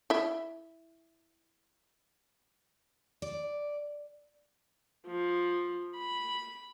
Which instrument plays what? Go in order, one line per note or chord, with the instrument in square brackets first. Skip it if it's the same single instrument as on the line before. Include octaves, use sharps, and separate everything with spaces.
[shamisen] E4 E5
[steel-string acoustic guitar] D5
[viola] F3
B5